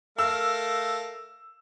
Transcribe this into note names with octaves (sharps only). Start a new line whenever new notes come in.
A3 A#4 F5 E6